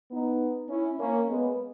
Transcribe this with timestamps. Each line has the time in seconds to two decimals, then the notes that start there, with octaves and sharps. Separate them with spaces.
0.11 B3 D#4
0.69 C#4 E4
0.99 A#3 C#4
1.28 G#3 B3